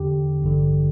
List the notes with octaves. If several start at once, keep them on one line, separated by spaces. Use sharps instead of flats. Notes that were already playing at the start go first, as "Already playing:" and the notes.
Already playing: E2 D3 G4
A1 G2 D3